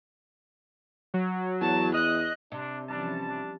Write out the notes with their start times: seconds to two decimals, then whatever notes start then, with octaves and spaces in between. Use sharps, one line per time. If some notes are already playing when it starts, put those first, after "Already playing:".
1.14 F#3
1.61 E2 A5
1.94 D#5 F#6
2.52 C3 D4
2.88 E3 F3 G3 C#4 D4 A5
3.27 D4